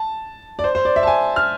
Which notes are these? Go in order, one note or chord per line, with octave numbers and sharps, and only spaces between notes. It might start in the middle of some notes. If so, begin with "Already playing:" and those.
Already playing: A5
D5
C5
C5
D5
E5
A5
G#5
F6